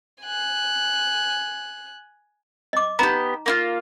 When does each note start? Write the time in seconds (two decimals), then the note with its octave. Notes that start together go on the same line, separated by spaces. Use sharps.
0.23 G#5 F#6
2.73 D#5 D6
2.99 B3 D#4 G4 A#5
3.46 A#3 E4 F4